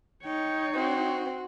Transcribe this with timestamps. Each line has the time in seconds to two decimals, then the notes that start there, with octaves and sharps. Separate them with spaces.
0.24 D#4 C#5 G5
0.75 C4 F#4